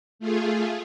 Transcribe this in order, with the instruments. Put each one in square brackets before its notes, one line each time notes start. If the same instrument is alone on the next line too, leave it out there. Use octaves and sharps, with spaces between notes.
[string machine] A3 F4 G#4